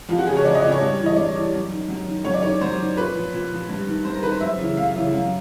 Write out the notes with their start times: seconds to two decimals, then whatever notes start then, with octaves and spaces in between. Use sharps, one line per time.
0.09 F2 F4
0.18 F#4
0.27 C#3 F3 G#4
0.36 C#5
0.45 F2 D5
0.55 D#5
0.63 C#3 F3 D5
0.72 C#5
0.81 G2
1.00 E3
1.06 D#5
1.17 G2 D5
1.36 E3
1.53 F#2
1.71 D#3
1.89 F#2
2.07 D#3
2.25 F#2 C#5
2.34 D5
2.43 D#3 C#5
2.61 F#2 C5
2.79 D#3
2.97 A#2 B4
3.15 F3
3.34 A#2
3.52 F3
3.69 G2
3.87 D#3
4.05 G2 C5
4.14 A#4
4.22 D#3 B4
4.32 C5
4.40 F#2 E5
4.58 C#3 E3
4.77 F#2 F5
4.95 C#3 E3
5.13 F#2